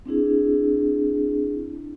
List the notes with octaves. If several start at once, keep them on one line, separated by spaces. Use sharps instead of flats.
C4 D4 E4 G#4